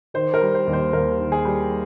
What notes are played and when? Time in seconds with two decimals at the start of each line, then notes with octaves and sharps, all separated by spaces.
0.14 D#3 C5
0.34 A#4
0.41 G3
0.54 C5
0.67 D#2
0.73 C5
0.93 D#2 A#4
1.19 D#3
1.32 G#4
1.45 G3